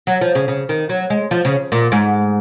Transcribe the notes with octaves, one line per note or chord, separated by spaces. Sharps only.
F#3
F3
C#3
C#3
D#3
F#3
G#3
F3
C#3
A#2
G#2